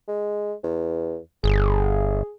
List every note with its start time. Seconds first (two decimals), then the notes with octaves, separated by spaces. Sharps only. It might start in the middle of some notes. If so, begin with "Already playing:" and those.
0.08 G#3
0.64 E2
1.44 G1 G#4